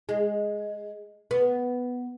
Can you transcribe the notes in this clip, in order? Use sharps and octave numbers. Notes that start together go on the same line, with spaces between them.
G#3
B3